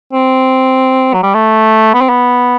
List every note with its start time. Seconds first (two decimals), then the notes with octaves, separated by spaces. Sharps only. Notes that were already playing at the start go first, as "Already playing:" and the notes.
0.13 C4
1.13 F#3
1.23 G3
1.34 A3
1.94 B3
2.01 C4
2.09 B3